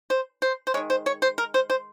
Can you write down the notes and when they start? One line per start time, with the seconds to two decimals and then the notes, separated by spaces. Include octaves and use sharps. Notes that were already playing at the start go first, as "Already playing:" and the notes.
0.10 C5
0.42 C5
0.67 C5
0.74 G#3 C#5
0.77 D#3
0.90 C5
1.06 C#5
1.22 C5
1.38 A#4
1.54 C5
1.70 C5